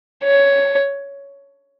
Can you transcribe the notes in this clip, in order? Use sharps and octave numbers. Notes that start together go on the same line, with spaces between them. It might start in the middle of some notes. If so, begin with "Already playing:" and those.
C#5